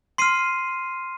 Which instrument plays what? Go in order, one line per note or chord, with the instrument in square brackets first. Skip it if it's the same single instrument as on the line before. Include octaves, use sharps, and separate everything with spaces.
[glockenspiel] C6 F6 C7 D#7